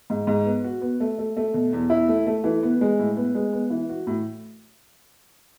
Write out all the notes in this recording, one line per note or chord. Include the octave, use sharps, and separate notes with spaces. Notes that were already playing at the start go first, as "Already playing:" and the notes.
G#2
G#2
B3
F#4
B3
A3
A3
A3
B2
E2
E4
A3
A3
E3
B3
G#3
A2
B3
G#3
B3
E3
F#4
A2